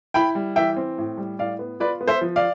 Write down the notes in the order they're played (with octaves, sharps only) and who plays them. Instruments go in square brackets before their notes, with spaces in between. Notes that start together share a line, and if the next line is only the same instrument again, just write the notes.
[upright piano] E4 G5 B5
G3
E3 E5 G5
C4
A2
G3
A2 D5 F5
B3
F4 B4 D5
B3
C5 E5
F3
D5 F5